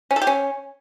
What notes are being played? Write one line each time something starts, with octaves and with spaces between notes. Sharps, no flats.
C#4
A4
G4
C#4